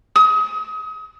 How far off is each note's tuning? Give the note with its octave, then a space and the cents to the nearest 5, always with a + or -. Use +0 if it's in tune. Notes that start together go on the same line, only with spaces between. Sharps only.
D#6 +35